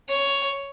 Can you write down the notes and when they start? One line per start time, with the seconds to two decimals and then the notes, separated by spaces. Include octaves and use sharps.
0.08 C#5